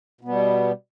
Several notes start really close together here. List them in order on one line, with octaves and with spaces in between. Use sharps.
B2 B3 G3